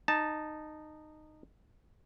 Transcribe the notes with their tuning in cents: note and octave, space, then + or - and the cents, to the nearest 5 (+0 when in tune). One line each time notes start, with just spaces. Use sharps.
D#4 -15 A5 +0